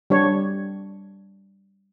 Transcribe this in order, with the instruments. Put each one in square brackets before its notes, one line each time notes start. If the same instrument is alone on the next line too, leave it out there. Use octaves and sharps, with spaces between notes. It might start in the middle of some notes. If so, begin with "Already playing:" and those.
[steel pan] G3 D4 C#5